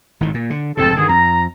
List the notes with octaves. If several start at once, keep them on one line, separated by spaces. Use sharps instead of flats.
G#1 A2 D#3
A#2
D3
F1 G#2 C3 C4 A4
G2 D3 D#3 G#4
F2 A#5